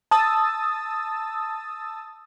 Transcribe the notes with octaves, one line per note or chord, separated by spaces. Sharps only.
A5 D#6 E6 A6